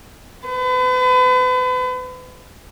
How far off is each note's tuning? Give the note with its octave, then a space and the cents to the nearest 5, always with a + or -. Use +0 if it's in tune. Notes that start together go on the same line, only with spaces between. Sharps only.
B4 +40